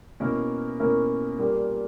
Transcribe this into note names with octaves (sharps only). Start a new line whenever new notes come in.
B2 A#3 C#4 E4 A#4
B2 A#3 C#4 E4 A#4
A#2 G3 A#3